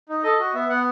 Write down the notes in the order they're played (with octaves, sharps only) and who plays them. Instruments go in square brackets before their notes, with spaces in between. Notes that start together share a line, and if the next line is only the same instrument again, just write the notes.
[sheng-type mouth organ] D#4
A4 D#5
F#4
B3 E5
B3 F#5